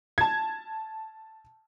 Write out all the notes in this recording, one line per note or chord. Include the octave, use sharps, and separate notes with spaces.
A5 G#6